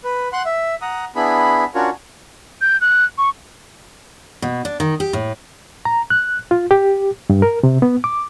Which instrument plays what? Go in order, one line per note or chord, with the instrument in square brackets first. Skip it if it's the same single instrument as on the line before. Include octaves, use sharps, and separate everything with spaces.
[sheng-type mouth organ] B4
F#5 C6 F#6
E5
F#5 A#5 D#6
B3 D4 E4 G#4 B5
C#4 D4 F4 F#4 A#4 C#5
[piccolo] G6
F#6
C#6
[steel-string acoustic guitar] B2
D4
D#3
G4
A2
[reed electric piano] A#5
F#6
F4
G4
G2
A#4
C3
B3
D6